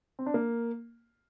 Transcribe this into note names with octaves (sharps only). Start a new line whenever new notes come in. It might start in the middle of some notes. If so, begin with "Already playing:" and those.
C4
D4
A#3